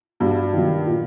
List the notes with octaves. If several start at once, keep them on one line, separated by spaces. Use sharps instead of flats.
G2 F#4
D#3 F#3
A#2